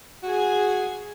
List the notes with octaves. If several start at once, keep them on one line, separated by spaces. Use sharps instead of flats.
F#4 G#4 G#5